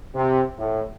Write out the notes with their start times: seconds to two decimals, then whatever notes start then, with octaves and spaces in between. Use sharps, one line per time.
0.14 C3
0.58 A2